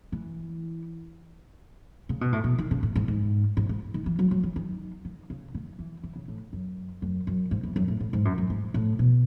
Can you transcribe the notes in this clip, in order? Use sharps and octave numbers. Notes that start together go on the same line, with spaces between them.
E3
C#3
B2
A2
B2
D#3
C#3
A2
G#2
G#2
G#2
G#2
D#3
E3
F#3
F#3
E3
D#3
D#3
C#3
D#3
E3
E3
C#3
A2
F#2
F#2
F#2
G#2
E2
F#2
A2
A2
G#2
F#2
F#2
G#2
A2
B2